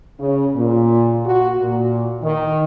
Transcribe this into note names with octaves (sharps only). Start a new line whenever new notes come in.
C#3
A#2
F#4
A#2
D#3